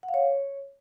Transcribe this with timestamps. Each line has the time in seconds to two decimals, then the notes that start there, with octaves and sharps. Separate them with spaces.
0.03 F#5
0.09 F5
0.14 C#5